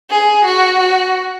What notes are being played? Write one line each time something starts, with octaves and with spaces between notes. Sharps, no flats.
G#4
F#4
F#4